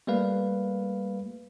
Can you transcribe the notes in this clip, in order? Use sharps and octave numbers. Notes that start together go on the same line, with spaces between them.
G3 A3 A#3 B4 F5